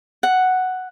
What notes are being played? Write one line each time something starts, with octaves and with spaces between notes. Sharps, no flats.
F#5